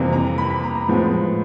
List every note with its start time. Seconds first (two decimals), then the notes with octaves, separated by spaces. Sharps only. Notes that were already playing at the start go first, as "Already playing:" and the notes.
Already playing: F2 C3 E3 G3 A#3
0.13 A#5
0.38 B5
0.50 B5
0.64 A#5
0.75 A#5
0.88 A2 F3 G#3 B3